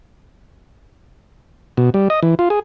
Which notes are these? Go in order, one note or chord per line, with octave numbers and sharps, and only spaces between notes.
B2
G3
D#5
E3
F4
G#4